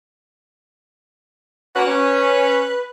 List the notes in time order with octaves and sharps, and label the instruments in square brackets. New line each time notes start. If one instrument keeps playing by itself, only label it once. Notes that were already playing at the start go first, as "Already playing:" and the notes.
[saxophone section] A#3 C#4 F#4 [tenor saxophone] B4
[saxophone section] C#4